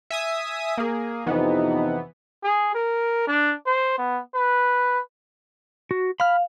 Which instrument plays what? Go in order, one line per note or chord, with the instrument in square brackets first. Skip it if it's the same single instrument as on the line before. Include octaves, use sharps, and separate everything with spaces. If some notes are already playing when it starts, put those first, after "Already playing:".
[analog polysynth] E5 G#5 D#6
A#3 G#4
[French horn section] F2 C3 D#4 [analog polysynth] E3 B3
[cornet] G#4
A#4
D4
C5
B3
B4
[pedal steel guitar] F#4
[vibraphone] F5 [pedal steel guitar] B5 F6